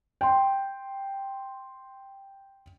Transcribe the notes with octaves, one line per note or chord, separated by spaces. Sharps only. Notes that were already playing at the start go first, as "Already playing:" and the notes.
G5 C6